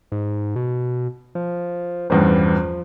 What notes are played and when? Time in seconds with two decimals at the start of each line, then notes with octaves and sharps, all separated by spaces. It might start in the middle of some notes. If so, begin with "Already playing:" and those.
0.12 G#2
0.56 B2
1.35 F3
2.10 A1 E2 G2 F3